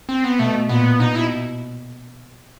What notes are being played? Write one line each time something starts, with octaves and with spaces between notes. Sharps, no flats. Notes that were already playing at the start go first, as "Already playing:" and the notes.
C4
B3
B2 A3
A#2 B3
B2 D#4
E4